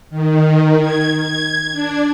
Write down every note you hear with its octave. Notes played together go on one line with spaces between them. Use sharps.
D#3
G#6
G#6
D4